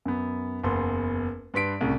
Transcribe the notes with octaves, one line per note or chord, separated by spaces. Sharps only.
F#2 B3
F#1 E2 B3 C6
G2 B4 C6 B6 D7
C2 A2 C#3